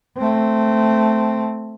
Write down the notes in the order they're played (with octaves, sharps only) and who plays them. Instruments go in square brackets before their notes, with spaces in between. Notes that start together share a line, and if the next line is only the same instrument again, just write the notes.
[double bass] A3 C4